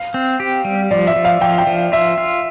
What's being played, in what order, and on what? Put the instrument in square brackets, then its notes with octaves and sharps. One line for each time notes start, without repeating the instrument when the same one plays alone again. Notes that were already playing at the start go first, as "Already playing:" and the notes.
Already playing: [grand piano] F5
[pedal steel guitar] C4
G4
G3
[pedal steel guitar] F3 [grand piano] D5
[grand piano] E5
[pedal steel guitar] F3
[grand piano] F5
[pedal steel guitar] F3 [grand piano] G5
[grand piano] G5
[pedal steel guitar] F3
[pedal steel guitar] F4 [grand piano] E5
[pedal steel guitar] F4